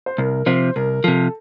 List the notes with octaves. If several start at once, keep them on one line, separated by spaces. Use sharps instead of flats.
C5
C2 A#4
C3 F3 C5
C2 A#4
C3 F3 A4